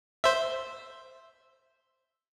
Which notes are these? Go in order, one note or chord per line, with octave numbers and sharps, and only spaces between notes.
C5 E5